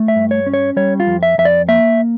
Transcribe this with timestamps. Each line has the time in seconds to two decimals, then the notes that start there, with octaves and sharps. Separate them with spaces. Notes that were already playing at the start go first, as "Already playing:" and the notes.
Already playing: A3
0.08 E5
0.16 G2
0.31 C#5
0.46 C#4
0.54 C#5
0.76 G3 C#5
1.00 F4
1.07 F2
1.23 E5
1.38 F2 E5
1.45 D5
1.68 A#3 E5